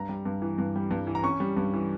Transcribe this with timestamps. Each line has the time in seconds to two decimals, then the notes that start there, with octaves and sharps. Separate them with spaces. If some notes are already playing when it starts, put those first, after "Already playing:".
Already playing: G2 A#5
0.09 G3
0.25 G2
0.42 E3
0.58 G2
0.75 G3
0.91 G2
1.07 E3
1.15 A#5
1.23 C#4 C#6
1.40 G3
1.57 G2
1.73 E3